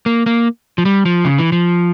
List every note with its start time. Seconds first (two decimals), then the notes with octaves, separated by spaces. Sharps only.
0.06 A#3
0.26 A#3
0.78 F3
0.85 G3
1.05 F3
1.25 C#3
1.38 E3
1.52 F3